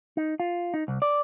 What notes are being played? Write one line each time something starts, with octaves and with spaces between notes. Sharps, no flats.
D#4
F4
D#4
C2
D5